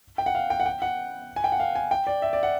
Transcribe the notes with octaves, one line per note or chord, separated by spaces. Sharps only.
G5
F#5
F5
G5
F#5
G5
F#5
G#5
G5
F#5
F5
G#5
G5
D5
E5
D5
F#5